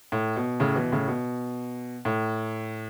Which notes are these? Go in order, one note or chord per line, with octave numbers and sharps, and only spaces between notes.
A2
B2
A2 C#3
B2 E3
A2 C#3
B2
A2